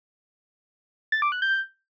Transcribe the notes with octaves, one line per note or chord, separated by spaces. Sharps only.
A6
D6
F#6
G6